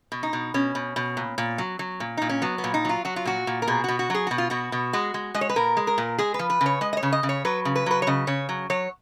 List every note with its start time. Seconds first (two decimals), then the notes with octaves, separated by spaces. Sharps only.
0.12 B2
0.23 D#4
0.33 B2
0.54 B2 C#4
0.75 B2
0.96 B2
1.17 A#2
1.38 A#2
1.58 F#3
1.79 F#3
2.00 A#2
2.17 A#2 D#4
2.29 C#4
2.42 F#3 B3
2.58 B3
2.64 A#2
2.74 D#4
2.85 F#3 F4
3.05 F#3 F#4
3.16 F4
3.25 A#2 F#4
3.47 A#2
3.62 A#4
3.68 B2 G#4
3.84 B2 F#4
3.99 F#4
4.10 F#3 G#4
4.27 B2 F#4
4.38 F4
4.50 B2 F#4
4.72 B2
4.93 G#3 F#4
5.14 G#3
5.34 G#3 D#5
5.41 C#5
5.49 B4
5.56 A#2 A#4
5.77 G#3
5.87 A#4
5.98 A#2
6.18 G#3 G#4
6.34 B4
6.39 F3
6.50 B4
6.61 C#3
6.66 C#5
6.81 G#3 D#5
6.93 D#5
6.97 C#5
7.03 C#3
7.12 D#5
7.23 C#3
7.29 C#5
7.45 F#3 B4
7.65 C#3
7.76 B4
7.86 F#3 B4
8.02 C#5
8.07 C#3 D#5
8.27 C#3 C#5
8.49 F#3
8.70 F#3 C#5